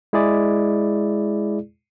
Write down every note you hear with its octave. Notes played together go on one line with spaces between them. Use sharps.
G#3 E4 G#4 D5